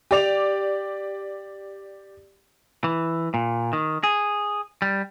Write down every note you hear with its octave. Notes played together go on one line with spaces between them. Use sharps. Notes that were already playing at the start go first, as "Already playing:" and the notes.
G4 D5 F7
E3
A#2
D#3
G#4
G3